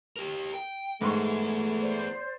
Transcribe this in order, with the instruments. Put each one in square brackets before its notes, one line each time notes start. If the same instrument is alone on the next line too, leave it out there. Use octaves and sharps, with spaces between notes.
[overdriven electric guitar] G4 A#4
G5
[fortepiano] G#2 C6 C#6 [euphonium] A3 [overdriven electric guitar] B3 G#4
[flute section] C5 D5